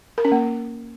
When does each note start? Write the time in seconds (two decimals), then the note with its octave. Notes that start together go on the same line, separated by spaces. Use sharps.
0.18 A#4
0.25 C#4
0.32 A#3